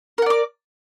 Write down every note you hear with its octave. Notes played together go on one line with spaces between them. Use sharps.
A#4 D5 F#5 D6